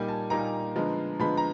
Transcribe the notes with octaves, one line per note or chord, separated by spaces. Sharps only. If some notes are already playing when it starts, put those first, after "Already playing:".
Already playing: A#2 G3 A#3 D#4 G#5
A5
A#2 G3 A#3 D#4 A#5
D3 F3 G#3 B3
D3 F3 G#3 B3 B5
A#5